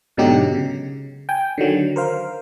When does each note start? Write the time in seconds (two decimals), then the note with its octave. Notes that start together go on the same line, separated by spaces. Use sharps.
0.17 G#2 B2 D3 F#3 D#4 G4
0.54 C#3
1.29 G5 G#5
1.58 D3 D#3 F#3
1.96 A#4 C5 F5